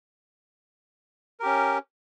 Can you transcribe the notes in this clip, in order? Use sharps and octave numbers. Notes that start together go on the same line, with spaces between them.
C#4 G4 A#4